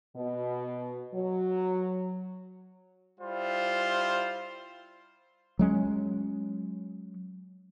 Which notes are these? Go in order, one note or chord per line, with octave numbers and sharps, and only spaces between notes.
B2
F#3
G3 E4 F4 C5
F#3 G#3 C#4